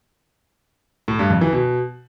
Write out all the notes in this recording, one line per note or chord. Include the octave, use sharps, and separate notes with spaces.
A2
G2
F2
E3
B2